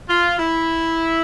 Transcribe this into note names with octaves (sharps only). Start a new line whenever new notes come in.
F4
E4